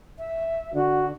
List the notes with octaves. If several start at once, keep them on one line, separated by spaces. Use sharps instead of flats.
E5
D3 F#4